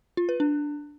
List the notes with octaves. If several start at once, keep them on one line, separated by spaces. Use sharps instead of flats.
F4
B4
D4